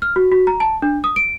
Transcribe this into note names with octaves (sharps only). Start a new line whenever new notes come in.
F6
F#4
F#4
A#5
A5
D4
D#6
D7